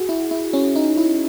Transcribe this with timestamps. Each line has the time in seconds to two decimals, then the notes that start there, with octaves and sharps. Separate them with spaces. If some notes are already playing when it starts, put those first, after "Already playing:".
Already playing: F#4 G#4
0.09 E4
0.31 E4
0.53 C#4
0.76 D#4
0.97 E4